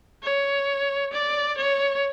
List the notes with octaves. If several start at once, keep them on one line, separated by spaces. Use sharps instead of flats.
C#5
D5
C#5